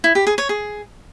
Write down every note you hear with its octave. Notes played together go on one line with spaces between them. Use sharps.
E4
G4
G#4
C#5
G#4